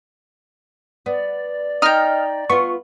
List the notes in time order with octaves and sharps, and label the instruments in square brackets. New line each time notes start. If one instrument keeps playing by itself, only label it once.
[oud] B3 [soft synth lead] D5
[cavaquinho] D#4 G5 [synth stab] D#5 F6
[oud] B3 F4 [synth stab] C#6